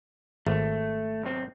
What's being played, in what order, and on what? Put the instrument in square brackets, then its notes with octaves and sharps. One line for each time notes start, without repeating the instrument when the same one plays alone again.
[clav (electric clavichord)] G#1 [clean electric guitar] A3
[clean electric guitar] B1 C4